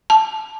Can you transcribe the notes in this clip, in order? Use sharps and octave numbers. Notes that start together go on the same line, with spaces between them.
A5